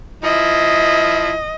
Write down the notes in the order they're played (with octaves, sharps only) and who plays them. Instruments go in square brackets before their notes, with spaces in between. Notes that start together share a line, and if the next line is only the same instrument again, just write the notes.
[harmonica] F3 E4 [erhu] D#5